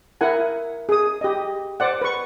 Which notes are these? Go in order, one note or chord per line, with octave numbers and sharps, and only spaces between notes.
E4 A#4 F#5 G#5
G#4 D#6
G4 D#5
C5 D5 F#5
B4 C#6